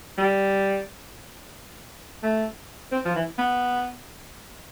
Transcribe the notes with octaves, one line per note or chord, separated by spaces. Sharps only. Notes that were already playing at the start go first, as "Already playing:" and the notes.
G3
A3
C4
F3
E3
B3